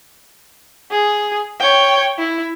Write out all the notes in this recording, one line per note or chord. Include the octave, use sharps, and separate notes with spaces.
G#4
C#5 G5
E4